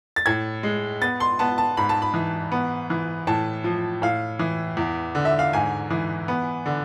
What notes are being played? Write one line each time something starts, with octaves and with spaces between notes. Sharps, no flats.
A6
A2 G#6
G#3
B3 A6
C6
B3 A5
A5
G#2 B5
A5
B5
E3
B3
E3
A2 A5
F3
A2 F5
E3
E2
D3
E5
F5
G#2 G#5
E3
B3
D3